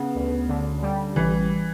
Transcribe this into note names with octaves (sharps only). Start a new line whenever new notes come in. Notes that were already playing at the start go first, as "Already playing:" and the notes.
Already playing: C#3 B3
D2
D3
G3
A1 E3